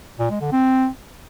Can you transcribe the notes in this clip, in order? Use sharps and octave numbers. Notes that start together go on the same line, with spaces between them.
A#2
G#3
D3
C4